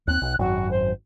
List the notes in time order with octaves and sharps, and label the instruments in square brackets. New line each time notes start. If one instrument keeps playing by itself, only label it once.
[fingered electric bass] D#2 C4 [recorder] F#6
[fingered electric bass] B1
[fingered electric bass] G#1 F#2 [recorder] F#4
[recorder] C5